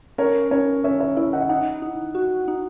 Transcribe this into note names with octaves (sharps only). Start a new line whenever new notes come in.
C#4 A#4 C#5
C#4 A#4 C#5
C#4 C#5 E5
C#5 E5
E4 C#5 E5
D#5 F#5
E5
D#4 D#5 F#5
D#4
F#4
D#4